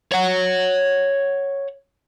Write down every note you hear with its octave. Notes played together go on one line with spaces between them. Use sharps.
C#5 F#5